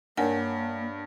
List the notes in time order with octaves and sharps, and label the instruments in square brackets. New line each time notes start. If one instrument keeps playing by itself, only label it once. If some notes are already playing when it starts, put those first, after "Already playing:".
[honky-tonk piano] G2 [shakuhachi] A#3 [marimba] A#4 G#5 [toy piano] C#5 F#5